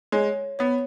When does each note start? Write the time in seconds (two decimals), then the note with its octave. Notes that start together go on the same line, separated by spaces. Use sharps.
0.12 G#3 C#5
0.59 B3 C#5